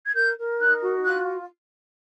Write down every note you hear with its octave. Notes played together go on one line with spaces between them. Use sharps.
G#6
A#4 G6
A#4
D#4 F#6
F#4
F4 F#6